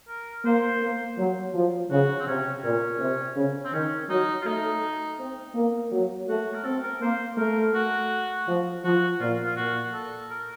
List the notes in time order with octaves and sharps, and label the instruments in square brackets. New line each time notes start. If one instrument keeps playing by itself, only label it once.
[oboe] A#4
[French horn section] A#3 [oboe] C5
[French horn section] A#3
F#3
F3
[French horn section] C#3 [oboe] F#4
[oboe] C4
[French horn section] C3 [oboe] C#4
[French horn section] A#2 [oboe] C#4
[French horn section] C3
C#3
[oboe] C4
[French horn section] D#3 [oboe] C#4
[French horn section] F#3 [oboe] D#4
[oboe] F4
[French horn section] A3 [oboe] D#4
[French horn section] C4
A#3
F#3
[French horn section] A3 [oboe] F#4
[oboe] A#4
[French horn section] C4 [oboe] A4
[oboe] A#4
[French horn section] A#3 [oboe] C5
[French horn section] A3 [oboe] A#4
[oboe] F#4
[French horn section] F3
[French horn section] F3 [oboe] F#4
[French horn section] A#2 [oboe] F4
[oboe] F4
[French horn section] A#2 [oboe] F#4
[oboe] A4
A#4